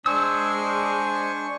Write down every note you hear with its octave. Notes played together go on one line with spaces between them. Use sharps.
G#3 D4 C5 G#5 C#6 E6